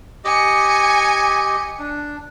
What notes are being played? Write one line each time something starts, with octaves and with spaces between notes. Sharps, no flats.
G4 D#5 G#5 C#7
D4